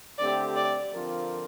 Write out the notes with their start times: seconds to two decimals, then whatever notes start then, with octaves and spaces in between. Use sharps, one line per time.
0.18 D3 A3 C4 G4 D5
0.56 D5
0.94 D3 F3 C4 F4 A#4